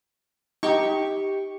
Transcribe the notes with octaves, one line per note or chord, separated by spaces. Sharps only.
D#4 G4 C#6